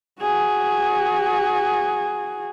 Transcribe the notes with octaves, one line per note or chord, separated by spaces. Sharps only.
F#4 G#4